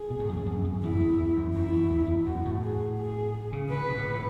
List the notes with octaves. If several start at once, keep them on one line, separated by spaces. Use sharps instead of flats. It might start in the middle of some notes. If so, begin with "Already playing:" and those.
Already playing: G#4
B2
A2
F#2
E2
F#2
F#2
E2 E4
E2
E2
F#2
F#2 E4
E2
E2
E2
F#2 F#4
A2
G#4
G#4
C#3
D3 B4
B2
A2
A2